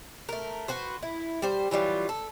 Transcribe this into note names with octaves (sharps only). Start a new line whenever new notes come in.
A3 A#4
F#4 B4 C5
E4
G3 C5
E3 F#3 G3 F4
A4